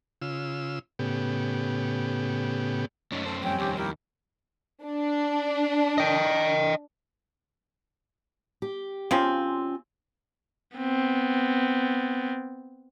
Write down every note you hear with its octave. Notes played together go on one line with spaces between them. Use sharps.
C#3 F4 E6
A2 C#3 B3 G4
F#2 A3 C#4 D#4
C#4 A4 C5
F2 G3 C4 C#4 G5
D#2 G4
E4 G4 A#4 E5
D4
D#5 G5
G4
C#3 F3 C4 C#4 F4 G#5
B3 C4